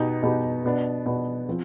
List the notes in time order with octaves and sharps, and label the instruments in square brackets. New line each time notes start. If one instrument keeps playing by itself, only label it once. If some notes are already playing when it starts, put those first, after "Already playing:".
Already playing: [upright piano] B2 B3 D#4 G4
B2 B3 D#4 G4
B2 B3 D4
B2 B3 D4
F3 C4